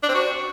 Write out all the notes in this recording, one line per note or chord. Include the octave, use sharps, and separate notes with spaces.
D4
C4
F#4